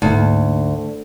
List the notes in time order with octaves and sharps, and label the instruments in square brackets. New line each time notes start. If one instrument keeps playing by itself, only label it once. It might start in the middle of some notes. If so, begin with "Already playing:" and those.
[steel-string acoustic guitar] D2 [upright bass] G#2 A#3